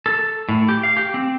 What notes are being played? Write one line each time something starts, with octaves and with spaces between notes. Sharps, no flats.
A4
A2
G4
F5
G4
C4